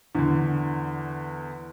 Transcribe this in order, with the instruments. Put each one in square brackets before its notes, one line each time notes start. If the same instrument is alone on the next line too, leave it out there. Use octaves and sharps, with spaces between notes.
[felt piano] E2 D3